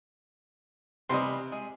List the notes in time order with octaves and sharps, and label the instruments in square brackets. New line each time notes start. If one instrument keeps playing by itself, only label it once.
[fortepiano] C3 C6 [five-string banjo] E3 G3 D#5
[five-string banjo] G#3